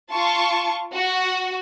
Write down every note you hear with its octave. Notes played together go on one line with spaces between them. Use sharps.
F4 A5 C#6
F#4